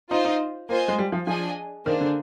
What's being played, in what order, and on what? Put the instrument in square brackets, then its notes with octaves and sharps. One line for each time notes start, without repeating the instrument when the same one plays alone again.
[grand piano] D#4 [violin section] F4 C5 D#5
[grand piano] D#4
[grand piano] A#3 [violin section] F4 C5 D#5 G#5
[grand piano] G#3
G3
F3
[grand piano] F3 [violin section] D4 G#4 D#5 G#5
[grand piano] D#3 [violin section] A#3 D4 G#4 C5
[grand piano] D3